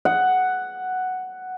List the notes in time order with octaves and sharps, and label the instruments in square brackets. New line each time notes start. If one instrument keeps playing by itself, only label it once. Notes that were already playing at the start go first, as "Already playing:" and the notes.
[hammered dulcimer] F#5